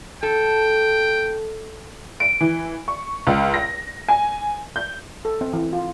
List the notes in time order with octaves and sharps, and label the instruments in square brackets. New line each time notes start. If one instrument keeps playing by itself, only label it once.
[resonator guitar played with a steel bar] A4 [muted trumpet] G5
[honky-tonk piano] D7
E3
C#6
C#2
A#6
G#5
G6
[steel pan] A4
C4
E3
F4